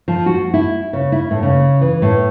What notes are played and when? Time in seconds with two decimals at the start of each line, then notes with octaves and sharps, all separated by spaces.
0.08 F3
0.26 F#4
0.54 E4
0.93 C#3
1.12 E4
1.31 A2
1.43 C#3
1.81 E3
2.02 A2